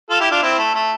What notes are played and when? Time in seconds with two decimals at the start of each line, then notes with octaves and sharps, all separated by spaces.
0.10 F4 A4
0.20 E4 G4
0.31 D4 F4
0.42 C4 E4
0.58 A3
0.75 A3